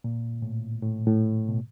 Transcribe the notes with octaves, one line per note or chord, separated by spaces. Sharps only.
A#2
A2
A2
A2
B2